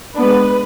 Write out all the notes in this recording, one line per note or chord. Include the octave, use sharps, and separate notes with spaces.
G#3 B3 D4 B4